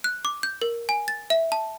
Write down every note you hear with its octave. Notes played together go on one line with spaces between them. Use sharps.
F#6
D6
G6
A#4
G#5
A6
E5
A5